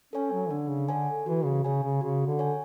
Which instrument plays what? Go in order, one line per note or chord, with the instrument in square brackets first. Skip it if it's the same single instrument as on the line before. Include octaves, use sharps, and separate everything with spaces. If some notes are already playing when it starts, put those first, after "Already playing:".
[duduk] C#4 [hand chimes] A4 C#5 G#5
[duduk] F#3
[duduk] D3 [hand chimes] D4
[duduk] C#3
[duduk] D3 [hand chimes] A4 C#5 G#5
[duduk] E3 [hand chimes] F#4
[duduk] C#3
[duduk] C#3 [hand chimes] C#5 G#5
[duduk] C#3
[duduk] C#3 [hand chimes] F#4
[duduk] D3
[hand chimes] C#5 G#5